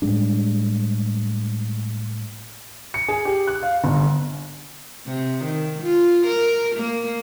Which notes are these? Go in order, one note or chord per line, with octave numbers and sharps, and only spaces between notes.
A2 G3 G#3 D4
C#7
G#4
G4
F#6
F5
G1
C3
D#3
F4
A#4
A#3